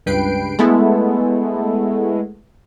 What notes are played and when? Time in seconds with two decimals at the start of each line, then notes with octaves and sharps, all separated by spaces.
0.06 C#2 G2 B4 G5 C7 D7
0.59 G#3 A3 B3 E4 A4